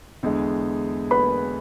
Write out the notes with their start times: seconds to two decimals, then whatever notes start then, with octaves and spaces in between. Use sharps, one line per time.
0.23 E2 D3 G#3
1.11 B4 B5